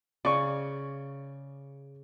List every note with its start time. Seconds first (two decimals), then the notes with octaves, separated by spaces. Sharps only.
0.25 C#3 D5 C#6